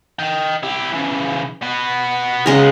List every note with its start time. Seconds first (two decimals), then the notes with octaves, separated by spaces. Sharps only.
0.19 D#5 G5
0.63 E4 G4
0.93 C#3 E3
1.62 B3 F#4
2.46 C#3 F#3 G#3 B3 A#4